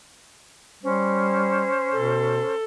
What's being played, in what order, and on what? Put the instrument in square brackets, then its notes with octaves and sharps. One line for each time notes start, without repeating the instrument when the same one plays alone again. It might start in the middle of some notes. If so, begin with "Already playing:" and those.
[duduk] G3 [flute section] C#4 C5
[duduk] B2 [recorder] A4